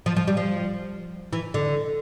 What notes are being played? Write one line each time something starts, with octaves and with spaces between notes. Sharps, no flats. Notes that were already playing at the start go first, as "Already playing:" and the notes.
F3
F3
G3
F3
E3
D3